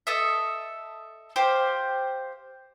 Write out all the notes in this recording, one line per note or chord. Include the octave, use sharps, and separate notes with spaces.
A4 D#5 E5
G4 C5 F5